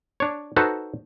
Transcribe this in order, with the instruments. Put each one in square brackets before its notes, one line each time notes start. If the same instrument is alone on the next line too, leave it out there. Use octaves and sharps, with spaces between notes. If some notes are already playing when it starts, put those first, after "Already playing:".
[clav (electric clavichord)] D4 C#5
D#4 F#4 A4 B4 C5